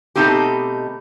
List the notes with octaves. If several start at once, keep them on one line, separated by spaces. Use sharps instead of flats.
B2 A3 C4 D#4 G4